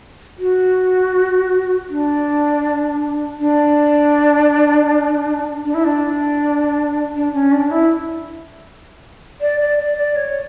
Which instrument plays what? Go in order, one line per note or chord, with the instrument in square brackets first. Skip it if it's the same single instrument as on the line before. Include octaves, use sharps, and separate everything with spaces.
[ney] F#4
D4
D4
D4
E4
D4
D4
C#4
D4
E4
D5
D5
D5
D5
C#5